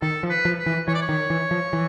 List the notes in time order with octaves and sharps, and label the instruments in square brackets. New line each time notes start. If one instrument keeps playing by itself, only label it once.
[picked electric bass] D#3 [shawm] A4
[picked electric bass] F3
[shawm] B4
[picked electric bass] F3
[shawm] B4
[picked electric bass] E3
[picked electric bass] E3 [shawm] C#5
[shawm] D5
C#5
[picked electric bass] D#3
E3
F3
E3